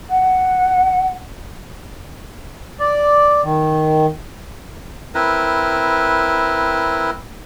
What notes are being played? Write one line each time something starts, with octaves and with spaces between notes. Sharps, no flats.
F#5
D5
D#3
C4 E4 A#4 B4